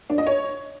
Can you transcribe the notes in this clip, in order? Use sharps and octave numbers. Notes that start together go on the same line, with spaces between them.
D4
D#5
C#5